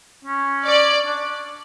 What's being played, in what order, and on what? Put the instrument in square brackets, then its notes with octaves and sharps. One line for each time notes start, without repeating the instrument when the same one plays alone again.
[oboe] C#4
[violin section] D5
[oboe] D4